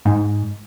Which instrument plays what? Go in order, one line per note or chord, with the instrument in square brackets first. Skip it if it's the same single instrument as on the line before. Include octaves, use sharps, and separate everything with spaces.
[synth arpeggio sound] G#2